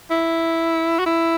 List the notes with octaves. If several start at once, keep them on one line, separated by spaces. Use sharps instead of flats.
E4
F#4
E4